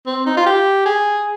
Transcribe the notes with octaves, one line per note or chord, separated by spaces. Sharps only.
C4
D#4
F4
G4
G#4